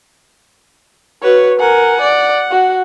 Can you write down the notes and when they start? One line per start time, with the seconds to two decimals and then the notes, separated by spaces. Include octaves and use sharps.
1.23 F#4 B4 C#5
1.60 A#4 F#5 G#5
2.01 D5
2.51 F#4